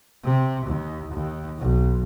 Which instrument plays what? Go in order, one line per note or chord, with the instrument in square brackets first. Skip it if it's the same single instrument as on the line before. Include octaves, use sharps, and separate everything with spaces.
[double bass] C3
D#2
D#2
B1